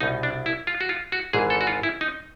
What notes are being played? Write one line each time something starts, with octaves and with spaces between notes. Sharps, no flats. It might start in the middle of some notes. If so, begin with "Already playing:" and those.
C2 B2 D#4
D4
E4
F4
F#4
F4
F#4
G#1 G#2 E3 G#4
A4
F#4
F4
E4
D#4